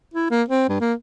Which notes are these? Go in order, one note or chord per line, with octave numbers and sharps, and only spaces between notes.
E4
A#3
C4
G2
A#3